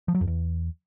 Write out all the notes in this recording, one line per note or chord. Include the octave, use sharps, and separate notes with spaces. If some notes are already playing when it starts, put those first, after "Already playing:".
F3
F#3
F2
E2